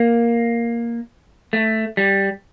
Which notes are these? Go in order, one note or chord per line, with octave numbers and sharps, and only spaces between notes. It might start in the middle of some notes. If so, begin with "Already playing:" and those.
Already playing: A#3
A3
G3